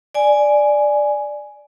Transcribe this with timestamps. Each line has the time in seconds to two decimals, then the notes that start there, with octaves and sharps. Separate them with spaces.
0.15 D5 G#5